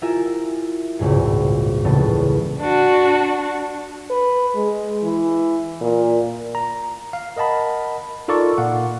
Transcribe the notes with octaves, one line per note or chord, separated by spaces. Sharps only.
E4 F4 G4 A#4 E5 G#5
G#1 C#2 G2 A#2 G#4
E1 A2 C#3 B3 A5
D4 F#4
B4
G#3
E3
A#2
A#5
F5
A#4 D#5 F#5 A5 B5
D#4 F4 A4 A#4 D5 C#6
A#2 F5 F#5